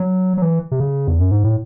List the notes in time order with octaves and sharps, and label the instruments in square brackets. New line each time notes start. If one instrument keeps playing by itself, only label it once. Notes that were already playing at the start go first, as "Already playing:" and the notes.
Already playing: [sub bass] F#3
F#3
E3
C3
C#3
E2
F#2
G#2
A2